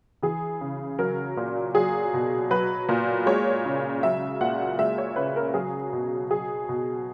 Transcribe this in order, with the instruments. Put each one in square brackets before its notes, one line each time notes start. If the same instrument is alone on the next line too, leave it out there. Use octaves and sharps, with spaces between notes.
[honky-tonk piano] E3 G#4
C#3
F#3 A#4
A#2
F#3 G#4
B2
F#3 B4
A#2
G#3 C#5
C#3
F#3 E5
A#2 F#5
G#3 E5
C#5
C#3 B4
A#4
F#3 G#4
B2
F#3 G#4
B2